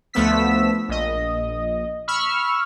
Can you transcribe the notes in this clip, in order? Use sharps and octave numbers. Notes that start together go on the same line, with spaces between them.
D2 F3 A3 B3 E6 B6
A#1 D#5
B5 C#6 E6 F6